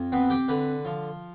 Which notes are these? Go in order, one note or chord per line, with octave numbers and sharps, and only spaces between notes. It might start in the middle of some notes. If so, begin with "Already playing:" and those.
Already playing: F2
B3 C4 B4
G4 G5
D3 B4 B5
F3